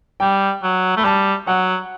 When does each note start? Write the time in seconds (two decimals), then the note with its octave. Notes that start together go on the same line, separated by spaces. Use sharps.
0.20 G3 G5
0.63 F#3
0.97 A3 B5
1.04 G3 A5
1.47 F#3 F#5